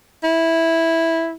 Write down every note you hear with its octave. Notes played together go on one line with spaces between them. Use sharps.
E4